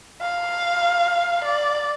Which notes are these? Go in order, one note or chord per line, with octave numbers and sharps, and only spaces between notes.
F5
D5